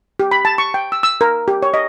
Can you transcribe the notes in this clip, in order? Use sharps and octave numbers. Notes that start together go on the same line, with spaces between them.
G4
B5
A5
C#6
G5
E6
E6
A#4
G4
C#5
D#5